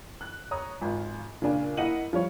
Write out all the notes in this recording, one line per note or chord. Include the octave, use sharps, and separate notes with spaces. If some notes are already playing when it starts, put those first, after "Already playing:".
F#6
C#5 A#5 D#6
G#1 F4 G#5
A#2 C#3 D4 G#5
A#3 E4 D#5 F#5 D#7 F#7
F3 G3 C#5